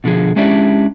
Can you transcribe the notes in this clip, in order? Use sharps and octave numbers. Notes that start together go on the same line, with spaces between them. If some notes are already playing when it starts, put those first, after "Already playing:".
B2 D3 F3 G#4
G#3 C#4 D4 E4 G4 D5